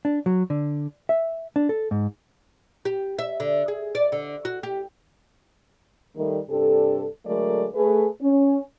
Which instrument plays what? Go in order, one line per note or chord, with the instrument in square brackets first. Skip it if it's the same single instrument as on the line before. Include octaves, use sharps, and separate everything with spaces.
[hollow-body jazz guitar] D4
F#3
D3
E5
D4
A4
G#2
[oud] G4
E5
D3
G#4
D5
D3
F#4
G4
[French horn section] D#3 G3 A3
G2 C3 D4 G4 A4
D3 F#3 G#3 A3 A#4 D5
A3 G#4 B4
C#4